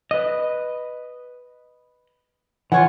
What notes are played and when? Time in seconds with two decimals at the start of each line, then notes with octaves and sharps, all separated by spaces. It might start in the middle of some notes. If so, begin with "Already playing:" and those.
0.11 B4 D#5
2.72 E3 F4 C#5 F#5